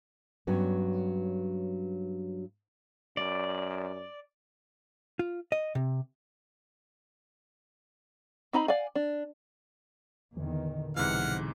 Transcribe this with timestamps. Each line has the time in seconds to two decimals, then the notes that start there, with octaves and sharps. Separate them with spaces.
0.47 G2 F#3 B3 C#4
3.17 F#2 D5
5.19 F4
5.52 D#5
5.75 C3
8.53 C4 D#4 A#5 B5
8.68 D5 F5 F#5 G#5
8.95 D4
10.37 E2 A#2 D3 D#3
10.96 B1 G#2 C3 E3 F3 F#5 F6